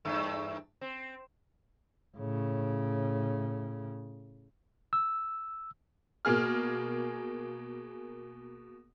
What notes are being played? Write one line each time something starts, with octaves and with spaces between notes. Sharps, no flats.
E2 G2 A3
C4
A2 C#3
E6
B2 A#3 G#4 F6